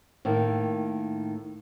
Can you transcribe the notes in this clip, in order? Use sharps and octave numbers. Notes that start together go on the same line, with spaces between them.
A2 D#3 A#3